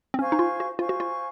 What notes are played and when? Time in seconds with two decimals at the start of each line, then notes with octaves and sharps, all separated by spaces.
0.14 C4
0.19 C#4 C5 F5 G#5 C#6
0.32 D#4
0.39 F4
0.60 F#4
0.79 F4 C5 F5 G#5 C#6
0.89 F#4
1.00 F4